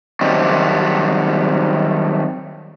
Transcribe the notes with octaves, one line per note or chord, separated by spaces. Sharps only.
D#3 F#3 G3 A3 C4